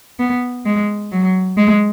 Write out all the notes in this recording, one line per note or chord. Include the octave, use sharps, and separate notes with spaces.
B3
G#3
F#3
G#3